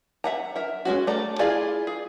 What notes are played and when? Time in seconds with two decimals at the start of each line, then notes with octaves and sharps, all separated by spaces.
0.24 E5 F#5 A#5
0.56 A#4 E5
0.85 G#3 C#4 F#4
1.07 A3 A4 D5 A#5
1.39 E4 F4 G#4 D5 F5
1.87 G#4